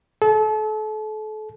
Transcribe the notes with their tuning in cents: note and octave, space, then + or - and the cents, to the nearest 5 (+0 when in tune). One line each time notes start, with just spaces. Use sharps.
A4 -35